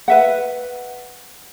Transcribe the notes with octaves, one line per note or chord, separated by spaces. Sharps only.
B4 E5 F#5